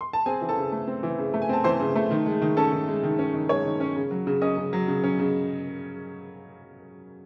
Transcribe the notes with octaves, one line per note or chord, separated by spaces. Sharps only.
C6
A5
C4 G#4 G#5
E3
A4 A5
C#3
A3
C4
E3
C#3
A3
G#5
C4 A5
E3 C5 C6
C#3
A3
D#3
G#3
D#3
C#4 A4 A5
D#3
G#3
D#3
C#4
D#3
G#3 C#5 C#6
D#3
C#4
C#3
F#3
C#3
C#4 D#5 D#6
C#3
F#3
C#3
C#4
C#3